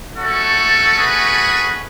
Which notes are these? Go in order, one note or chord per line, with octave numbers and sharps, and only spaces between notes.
A3 C#4 F#4 A4
G#4 B4